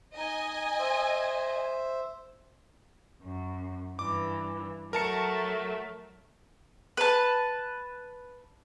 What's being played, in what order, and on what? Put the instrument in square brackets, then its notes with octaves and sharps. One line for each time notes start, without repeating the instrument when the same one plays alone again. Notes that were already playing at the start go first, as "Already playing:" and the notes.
[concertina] D#4 [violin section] D#5 G#5
[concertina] C5 E5
[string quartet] F#2
[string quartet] G2 E3 [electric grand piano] D6
[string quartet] F#3 A3 [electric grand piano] A#4 A5 C#7
[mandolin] B4 A5